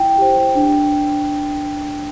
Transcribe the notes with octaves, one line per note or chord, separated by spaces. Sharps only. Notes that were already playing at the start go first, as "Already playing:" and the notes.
Already playing: E4 G5
G4 C5
D4